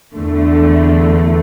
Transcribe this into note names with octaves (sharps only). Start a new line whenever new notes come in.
E2 D3 A3